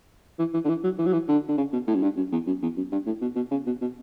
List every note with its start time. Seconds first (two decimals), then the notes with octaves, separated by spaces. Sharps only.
0.39 E3
0.54 E3
0.64 D3
0.69 E3
0.84 F#3
0.99 E3
1.06 F#3
1.13 E3
1.28 D3
1.49 D3
1.57 C#3
1.73 B2
1.87 A2
1.95 F#2
2.03 G2
2.17 F#2
2.32 E2
2.47 F#2
2.62 E2
2.77 F#2
2.92 G2
3.06 A2
3.21 B2
3.36 B2
3.51 C#3
3.66 B2
3.81 B2